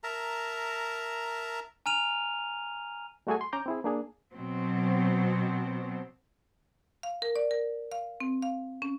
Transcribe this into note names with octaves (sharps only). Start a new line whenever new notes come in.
A#4 E5 A5 A#5
G#5 A#5 F6 D#7 F7
G3 A3 F#4 G#4 A4 G#5
C6
C#4 A#5 D6 G6
C4 E4 G#4
A#3 D4 G#4
B2 F#3 C4
F5
A#4
D5
A#4
F5
C4
F5
C#4